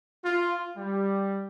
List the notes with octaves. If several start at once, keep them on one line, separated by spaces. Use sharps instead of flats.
F4
G3